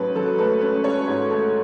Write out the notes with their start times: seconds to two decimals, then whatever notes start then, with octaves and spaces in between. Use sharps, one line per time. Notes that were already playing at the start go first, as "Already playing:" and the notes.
Already playing: G#2 F#3 A3 C#4 B4
0.15 F#3 A4
0.38 A3 B4
0.61 C#4 B4
0.84 C#4 C#5
1.08 G#2
1.30 A3